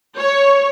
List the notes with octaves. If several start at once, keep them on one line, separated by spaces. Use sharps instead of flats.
C#5